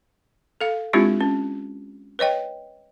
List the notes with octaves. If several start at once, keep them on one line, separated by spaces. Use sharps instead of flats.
A4 F5
G#3 C4 D4 E4 F4 G4
C#4
B4 C#5 D#5 G5